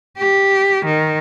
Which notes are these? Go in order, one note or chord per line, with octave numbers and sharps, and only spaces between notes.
G4
D#3